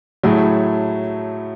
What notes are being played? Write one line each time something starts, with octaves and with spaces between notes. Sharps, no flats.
A2 F#3 A3 E4 G#4